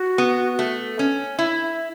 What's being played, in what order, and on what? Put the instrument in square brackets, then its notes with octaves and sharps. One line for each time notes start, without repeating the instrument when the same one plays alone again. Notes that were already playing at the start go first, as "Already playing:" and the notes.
Already playing: [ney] F#4
[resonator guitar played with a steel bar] B3
A3
C#4
E4